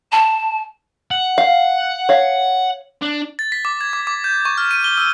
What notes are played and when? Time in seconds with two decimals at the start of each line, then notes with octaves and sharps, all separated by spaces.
0.12 A5
1.11 F#5
1.38 F5
2.09 C#5 F5
3.02 D4
3.39 A6
3.52 B6
3.65 D6
3.81 G#6
3.93 D6
4.07 D6
4.24 G6
4.45 C#6
4.58 F6
4.71 D#7
4.84 G7
4.98 E6